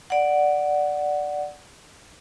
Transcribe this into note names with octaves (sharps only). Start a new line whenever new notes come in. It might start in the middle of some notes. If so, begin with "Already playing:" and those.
D5 F#5